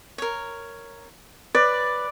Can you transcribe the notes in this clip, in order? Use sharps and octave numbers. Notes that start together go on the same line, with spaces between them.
A#4 C#5
B4 D5